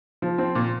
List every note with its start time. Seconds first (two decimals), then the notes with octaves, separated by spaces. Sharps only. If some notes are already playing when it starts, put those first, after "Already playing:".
0.22 F3
0.38 C4
0.55 A#2